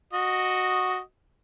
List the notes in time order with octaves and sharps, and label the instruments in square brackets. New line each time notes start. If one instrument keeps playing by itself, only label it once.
[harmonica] F#4 D#5